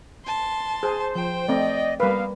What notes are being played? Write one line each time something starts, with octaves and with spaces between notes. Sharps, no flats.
A5 C6
G#4 C5
F3 G5
A3 C4 D5 D#5
G3 A#3 B3 A#4 B4 F5